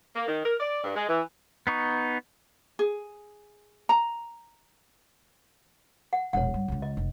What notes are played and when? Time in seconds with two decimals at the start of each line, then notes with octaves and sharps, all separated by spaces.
0.16 A#3
0.28 D#3
0.44 A#4
0.60 D5
0.84 G2
0.96 G#3
1.09 E3
1.67 B3 D#4 C#6
2.79 G#4
3.89 A#5
6.13 F#5
6.33 E1 A#1 C#5 F#5
6.54 G2
6.68 C#2 C#3
6.82 D#5
6.97 F1